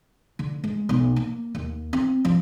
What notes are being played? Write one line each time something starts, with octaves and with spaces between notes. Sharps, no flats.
D3
G#3
B1
A#3
D#2
C4
F3